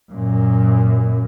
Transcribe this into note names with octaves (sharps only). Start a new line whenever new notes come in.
F#2 A#2